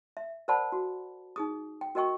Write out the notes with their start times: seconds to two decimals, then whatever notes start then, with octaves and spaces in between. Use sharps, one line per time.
0.17 E5
0.48 A#4 C5 D5 F#5 A5 B5
0.72 F#4
1.36 D#4 G#4 D#6
1.81 G5
1.95 F#4 A#4 D#5 G5 C#6